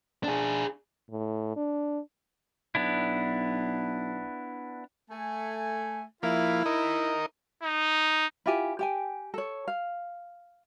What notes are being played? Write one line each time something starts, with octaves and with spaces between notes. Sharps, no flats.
D4 G#4
A2
D4
B1 B3 D4 E4
A3 G#5
F3 A#3 E4 F5
D#4 A#4 D#5
D#4
E4 F4 G4 G#5
G4 G5 G#5
A4 C#5
F5